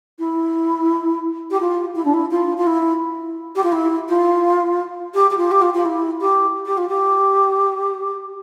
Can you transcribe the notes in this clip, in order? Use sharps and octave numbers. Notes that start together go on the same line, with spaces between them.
E4
G4
F4
E4
D4
E4
F4
F4
E4
G4
F4
E4
F4
G4
G4
F4
G4
F4
F4
E4
G4
G4
F4
G4